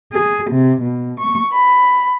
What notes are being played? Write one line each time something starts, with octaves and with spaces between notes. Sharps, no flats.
G#4
C3
B2
C#6
B5